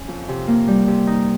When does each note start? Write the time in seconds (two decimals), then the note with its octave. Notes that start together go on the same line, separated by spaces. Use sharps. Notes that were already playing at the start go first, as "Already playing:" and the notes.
Already playing: C#4
0.08 F2
0.29 C3
0.47 A#3
0.68 G3
0.87 C3
1.07 D#4